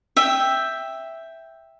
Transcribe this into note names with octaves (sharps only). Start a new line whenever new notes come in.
E5 G5